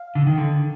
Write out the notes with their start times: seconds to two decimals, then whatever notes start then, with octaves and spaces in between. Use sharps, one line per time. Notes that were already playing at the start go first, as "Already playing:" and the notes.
Already playing: F5
0.15 D3
0.27 D#3
0.38 D3